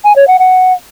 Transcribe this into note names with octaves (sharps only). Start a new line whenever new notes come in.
G#5
C#5
F#5
F#5